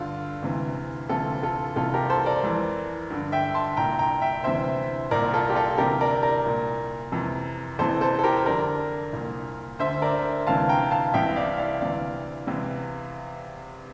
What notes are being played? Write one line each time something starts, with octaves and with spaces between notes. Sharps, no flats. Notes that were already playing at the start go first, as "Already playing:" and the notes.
Already playing: G2 D3 F4
D2 C3 E3
D2 C3 E3 F4 A4
F4 A4
C2 C3 E3 F4 A4
G4 A#4
A4 C5
A#4 D5
F2 E3
G2 D3
E5 G5
A5 C6
C2 A#2 G5 A#5
G5 A#5
E5 G5
D2 C3 E3 C5 E5
C2 A#2 A#4 D5
F4 A4
G4
F4 A4
D2 C3 E3 G4 A#4
A#4 D5
A#4 D5
C2 A#2
F2 C3 E3
E2 C3 E3 A4 C5
A4 C5
A4
G4 A#4
F2 D3 A#4 D5
C2 A#2
D2 D3 C5 E5
A#4 D5
D2 C3 E3 F5 A5
G5 A#5
F5 A5
C2 C3 E3 E5 G5
D5 F5
D5 F5
D2 C3 E3 D5 F5
E2 C3 E3